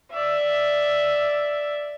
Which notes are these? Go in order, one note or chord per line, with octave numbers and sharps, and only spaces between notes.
D5 E5